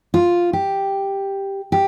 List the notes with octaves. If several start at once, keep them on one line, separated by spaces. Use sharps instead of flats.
F4
G4
G4